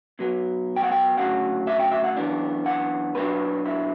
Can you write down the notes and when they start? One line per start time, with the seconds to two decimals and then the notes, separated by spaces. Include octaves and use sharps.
0.19 B2 F#3 B3
0.76 G5
0.83 F#5
0.92 G5
1.18 D2 C#3 F#3 F#5
1.67 E5
1.80 G5
1.91 E5
2.04 F#5
2.17 F#2 E3 B3 D4
2.66 F#5
3.15 B2 F#3 B3 D4 B4
3.66 E4